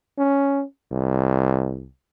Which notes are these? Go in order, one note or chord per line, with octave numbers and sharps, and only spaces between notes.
C#4
C2